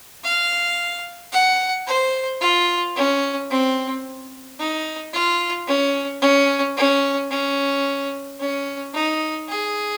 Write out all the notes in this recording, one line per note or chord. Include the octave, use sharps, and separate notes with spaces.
F5
F#5
C5
F4
C#4
C4
D#4
F4
C#4
C#4
C#4
C#4
C#4
D#4
G#4